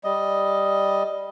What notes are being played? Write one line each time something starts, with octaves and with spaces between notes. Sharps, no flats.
G3 D#5